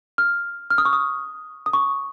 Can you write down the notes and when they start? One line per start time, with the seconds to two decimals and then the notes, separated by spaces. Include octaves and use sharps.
0.18 F6
0.70 F6
0.78 D#6
0.85 C#6
0.93 D#6
1.66 D#6
1.73 C#6